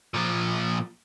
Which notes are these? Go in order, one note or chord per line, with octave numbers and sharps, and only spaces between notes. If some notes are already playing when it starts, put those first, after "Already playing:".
A#2 F3